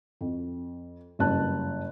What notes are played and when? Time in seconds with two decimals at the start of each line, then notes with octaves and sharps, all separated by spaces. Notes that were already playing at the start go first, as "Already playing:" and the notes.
0.21 F2
1.19 F#1 G2 A5 F#6